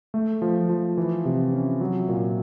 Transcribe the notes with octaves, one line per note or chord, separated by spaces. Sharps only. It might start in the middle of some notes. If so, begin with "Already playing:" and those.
A3
F3
F3
E3
C3
C#4
F#3
A#2